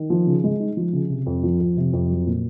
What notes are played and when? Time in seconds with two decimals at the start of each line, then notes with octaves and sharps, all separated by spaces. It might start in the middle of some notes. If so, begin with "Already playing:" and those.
Already playing: D#3
0.10 F3
0.27 C#3
0.44 G#3
0.60 D#4
0.77 F3
0.93 C#3
1.09 C3
1.26 F2
1.43 F3
1.60 F2
1.77 C3
1.93 F2
2.10 F#3
2.27 A#2